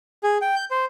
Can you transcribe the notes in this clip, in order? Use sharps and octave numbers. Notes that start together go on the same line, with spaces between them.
G#4
G5
G6
C5